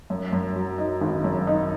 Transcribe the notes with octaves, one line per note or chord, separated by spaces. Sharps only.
F#2
F#2
F#3
D#4
G#1
F#2
D#4